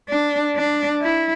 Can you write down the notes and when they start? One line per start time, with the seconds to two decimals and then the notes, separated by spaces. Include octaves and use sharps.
0.09 D4
0.56 D4
1.01 E4